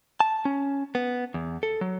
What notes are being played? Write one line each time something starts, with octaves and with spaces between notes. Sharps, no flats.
A5
C#4
B3
E2
A4
F#3